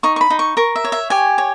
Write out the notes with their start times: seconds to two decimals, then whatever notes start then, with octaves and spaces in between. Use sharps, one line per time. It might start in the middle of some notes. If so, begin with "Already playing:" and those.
0.03 D#4 C#6
0.16 C#6
0.21 B5
0.30 D#4
0.39 C#6
0.57 A#4 C#6
0.76 E5
0.84 C#5
0.92 E5
1.10 G4 G#5
1.38 C#5